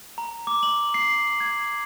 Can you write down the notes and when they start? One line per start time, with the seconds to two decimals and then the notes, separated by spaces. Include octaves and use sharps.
0.18 A#5
0.47 D6
0.63 F#7
0.94 C7
1.40 G#6